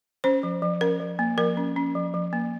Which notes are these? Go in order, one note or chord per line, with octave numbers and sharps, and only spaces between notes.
C#4 C5
F3
F3
C#4 A#4
F3
A#3
F3 A#4
C#4
C#4
F3
F3
A#3